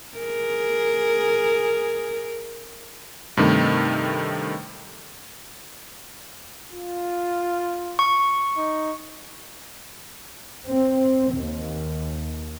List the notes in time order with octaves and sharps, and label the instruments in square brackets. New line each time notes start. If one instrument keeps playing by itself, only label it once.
[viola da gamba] G#4 A#4
[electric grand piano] G2 C3 D#3 A3
[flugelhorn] F4
[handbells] C#6
[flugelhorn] D#4
[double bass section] C4
D#2